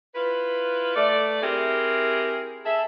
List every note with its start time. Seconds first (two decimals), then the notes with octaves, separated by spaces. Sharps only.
0.15 E4 F4 B4
0.96 A3 D5
1.42 C4 E4 G4 G#4 A#4
2.65 G#4 A4 E5